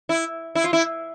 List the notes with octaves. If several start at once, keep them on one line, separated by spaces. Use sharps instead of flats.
E4
E4
F4
E4